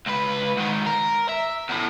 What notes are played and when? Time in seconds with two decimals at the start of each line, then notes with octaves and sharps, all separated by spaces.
0.06 C#2 B4
0.57 G#2 D#3
0.86 A#4
1.29 E5
1.69 E2 A2